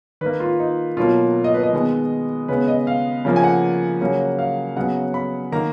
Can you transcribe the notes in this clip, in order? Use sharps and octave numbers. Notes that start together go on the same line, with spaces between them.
D#3 A#3 B4
F4
D#4
B2 F#3 A#3 F4
D#5
B4
D#5
D#3 G#3 B3
C#3 G#3 B3 B4
D#5
F5
C#3 F3 A#3
G#5
F#5
C#3 F#3 A#3
F5
C#3 F#3 B3 F#5
B5
D#3 A#3 A#5